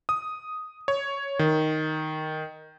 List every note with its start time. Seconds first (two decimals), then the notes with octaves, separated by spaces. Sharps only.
0.09 D#6
0.88 C#5
1.39 D#3